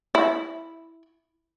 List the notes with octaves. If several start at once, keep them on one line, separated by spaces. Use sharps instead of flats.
E4